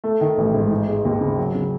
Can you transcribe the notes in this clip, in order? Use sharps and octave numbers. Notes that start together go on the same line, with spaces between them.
A3
D#3
A1
G#2
D#4
G#3
D#2
C#3
F#3
C#3